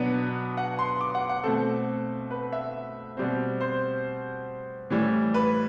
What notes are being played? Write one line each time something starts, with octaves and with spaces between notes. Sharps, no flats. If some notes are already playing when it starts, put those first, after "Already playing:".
Already playing: B2 F#3 B3 D4
F#5
C6
D6
F#5
F#5
B2 A3 C4 A4
B4
E5
B2 G3 C4
C5
A2 E3 G3
B4